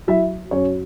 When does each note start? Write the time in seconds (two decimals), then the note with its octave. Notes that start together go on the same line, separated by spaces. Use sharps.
0.08 F#3 E4 E5
0.51 F#2 C#4 C#5